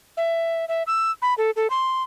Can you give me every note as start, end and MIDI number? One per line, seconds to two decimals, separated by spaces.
0.17 0.65 76
0.68 0.83 76
0.87 1.11 88
1.22 1.34 83
1.38 1.51 69
1.56 1.67 69
1.70 2.03 84